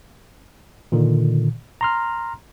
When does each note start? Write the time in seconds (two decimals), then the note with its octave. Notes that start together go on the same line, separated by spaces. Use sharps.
0.92 A#2 D3 D#3
1.81 A#5 C6 F6